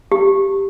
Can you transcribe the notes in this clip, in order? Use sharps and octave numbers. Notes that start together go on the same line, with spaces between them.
G4